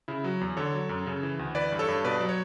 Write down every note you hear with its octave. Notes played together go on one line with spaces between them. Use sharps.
C#3 E4
F#3
E2
D3 A4 C#5
F#3
F#2
C#3
E3
D2
E3 B4 D5
G2
A4 C#5
G2
B2 B4 D5
F#3
C#5